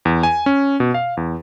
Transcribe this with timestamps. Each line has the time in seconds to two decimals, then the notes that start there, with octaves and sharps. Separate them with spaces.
0.05 E2
0.23 G#5
0.46 C#4
0.80 B2
0.94 F5
1.17 E2